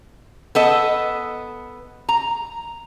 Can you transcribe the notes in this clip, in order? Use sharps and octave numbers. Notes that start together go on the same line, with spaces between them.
B3 A4 D#5
A#5